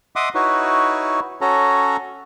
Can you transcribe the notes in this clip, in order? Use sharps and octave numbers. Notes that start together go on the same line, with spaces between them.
D#5 E5 F#5 C6 D6 D#6
D#4 E4 F#4 B4 C#5
C#4 F#4 A4 C#5 A#5